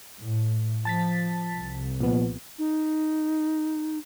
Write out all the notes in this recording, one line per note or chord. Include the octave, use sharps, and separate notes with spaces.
A2
F3 A5 A6 B6
C2
A#2 F3 B3
D#4